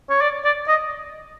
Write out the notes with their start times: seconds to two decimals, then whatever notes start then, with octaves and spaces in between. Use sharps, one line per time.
0.10 C#5
0.21 D5
0.44 D5
0.68 D#5